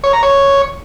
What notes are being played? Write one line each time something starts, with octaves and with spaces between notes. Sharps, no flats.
C#5
A#5
C#5